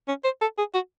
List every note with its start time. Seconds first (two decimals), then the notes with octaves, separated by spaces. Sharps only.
0.08 C#4
0.24 C5
0.42 A4
0.58 G#4
0.75 F#4